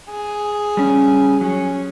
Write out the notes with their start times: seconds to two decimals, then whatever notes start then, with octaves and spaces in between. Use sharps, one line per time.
0.10 G#4
0.77 G3 C#4
1.41 F#3 C#4